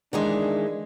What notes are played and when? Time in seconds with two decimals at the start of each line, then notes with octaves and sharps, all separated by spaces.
0.13 D#3 E3 G#3 D4